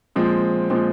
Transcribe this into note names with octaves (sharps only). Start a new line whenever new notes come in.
A#2 F3 G#3 C4
A#2 F3 G#3 C4